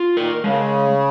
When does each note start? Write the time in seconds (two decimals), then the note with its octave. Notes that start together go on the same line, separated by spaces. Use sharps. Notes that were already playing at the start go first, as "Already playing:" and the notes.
Already playing: F4
0.16 D#3 A#4
0.43 C#3 G#3